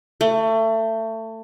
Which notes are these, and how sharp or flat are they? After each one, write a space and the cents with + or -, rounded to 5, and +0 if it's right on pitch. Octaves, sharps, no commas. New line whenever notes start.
A3 +25